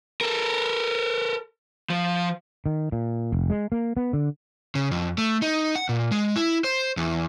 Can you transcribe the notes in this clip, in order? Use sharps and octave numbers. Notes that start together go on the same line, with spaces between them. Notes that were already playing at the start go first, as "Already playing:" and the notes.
A4 A#4
F3
D#3
A#2
F1
G#3
A#3
B3
D3
C#3
F2
A3
D#4
F#5
A#2
G#3
E4
C5
E2